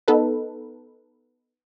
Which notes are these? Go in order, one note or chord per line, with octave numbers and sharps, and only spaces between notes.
B3 D#4 A4 B4